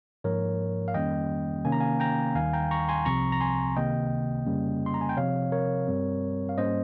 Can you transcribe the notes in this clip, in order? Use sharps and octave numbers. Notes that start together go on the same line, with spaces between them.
G#2 F3 A#3 A#4 C#5
F5
F2 D#3 G3 A#3 C#4 D#5 G5
C3 D#3 A#3 C#4 G#5
A#5
F5 G#5
G5 A#5
D#2 D#3 G3 F5 G#5
G5 A#5
A#5 C#6
G#5 C6
C2 C3 F3 C4 A#5 C#6
A#5
G#5 C6
C#2 C3 D#3 A#3 D#5 G5
F2 C#3 G3 A#3 C#4
C6
A#5
G#5
G5
C3 F3 C4 C#5 F5
A#4 C#5
G2 G3 C4
F5
G#2 G3 A#3 C#4 C5 D#5